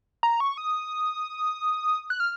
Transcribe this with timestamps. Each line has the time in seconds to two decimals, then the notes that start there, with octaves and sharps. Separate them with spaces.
0.23 A#5
0.40 C#6
0.57 D#6
2.10 F#6
2.20 F6